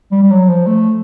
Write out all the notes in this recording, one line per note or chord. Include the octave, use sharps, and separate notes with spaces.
G3
G3
F#3
F3
A3